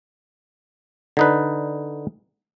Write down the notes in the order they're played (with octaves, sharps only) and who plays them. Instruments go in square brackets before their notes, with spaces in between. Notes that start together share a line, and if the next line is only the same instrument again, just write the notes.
[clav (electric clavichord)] D3 D#4 B4